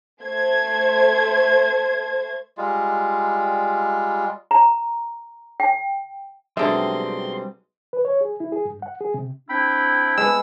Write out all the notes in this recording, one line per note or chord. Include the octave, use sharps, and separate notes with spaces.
A3 C5 G#6
G3 G#3 F4
A#5
G5
B1 D3 G3 G#3 C4 D#4 E5 C6
B4
C#5
G#4
E4
G#4
G2
F#5
G#4
C3
C4 D4 E4 G5 B5
G#3 B3 E6